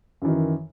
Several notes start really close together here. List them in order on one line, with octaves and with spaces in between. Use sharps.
F#2 E3 D#3